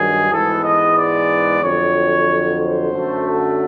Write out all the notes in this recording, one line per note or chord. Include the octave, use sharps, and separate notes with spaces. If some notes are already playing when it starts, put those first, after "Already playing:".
Already playing: G2 D#3 F#3 G#4
G#2 E3 G#3 B3 A4
D#5
D5
F2 D3 F#3 C#5
C5
F#2 D3 F#3 A3
A4